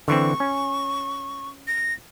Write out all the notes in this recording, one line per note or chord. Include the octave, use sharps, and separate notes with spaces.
D3 E3 C4 C#6
C#4
A#6